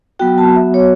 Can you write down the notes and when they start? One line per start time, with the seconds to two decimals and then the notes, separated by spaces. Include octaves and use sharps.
0.19 F#3 B3 F#4 G5
0.38 A5
0.56 E5
0.74 C#5